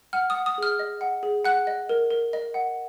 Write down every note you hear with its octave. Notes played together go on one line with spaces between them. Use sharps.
F#5 F6
D#6
F#5
D#6
G#4 F6
D#5
F#5
G#4
F#5 F#6
D#5
A#4
A#4
D#5
F#5